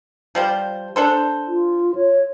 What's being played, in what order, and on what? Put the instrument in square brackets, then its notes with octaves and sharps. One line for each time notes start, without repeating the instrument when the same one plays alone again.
[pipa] F3 G3 C5
D4 A4 C5
[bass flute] F4
C#5